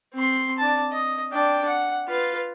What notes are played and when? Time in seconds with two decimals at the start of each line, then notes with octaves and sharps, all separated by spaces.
0.14 C4 C6
0.58 D4 A5
0.91 D#5
1.32 D4 G5
1.67 F#5
2.08 F4 B4